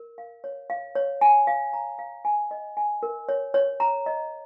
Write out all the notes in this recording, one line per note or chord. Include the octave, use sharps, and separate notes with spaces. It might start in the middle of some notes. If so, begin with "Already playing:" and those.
Already playing: A#4
F5
C#5
F5
C#5
G#5
F5
A#5
F5
G#5
D#5
G#5
A#4
C#5
C#5
A#5
D#5